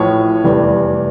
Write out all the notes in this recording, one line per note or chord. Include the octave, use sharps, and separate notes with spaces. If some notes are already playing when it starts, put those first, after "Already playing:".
Already playing: A1 A2 F3 C#5
F1 E2 E3 G3